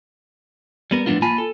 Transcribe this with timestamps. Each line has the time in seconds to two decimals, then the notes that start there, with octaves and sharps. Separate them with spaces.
0.91 G3 B3 A#4
1.06 A2 F3 A#3 B3 D4 F4
1.22 A#3 F4 G#5 A5 B5
1.38 A4